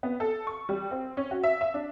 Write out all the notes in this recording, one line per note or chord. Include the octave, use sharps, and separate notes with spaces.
B3
A4
C#6
G3
C4
C#4
F#4
E5
E5
D4